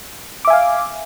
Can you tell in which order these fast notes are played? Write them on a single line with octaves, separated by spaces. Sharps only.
D6 E5 G#5 F5